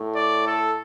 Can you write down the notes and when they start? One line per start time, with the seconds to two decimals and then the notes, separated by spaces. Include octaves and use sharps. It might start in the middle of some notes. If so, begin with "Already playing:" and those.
Already playing: A2
0.15 D5
0.47 A4